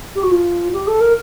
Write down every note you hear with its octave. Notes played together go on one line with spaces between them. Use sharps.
G4
F#4
F4
G4
A4
A#4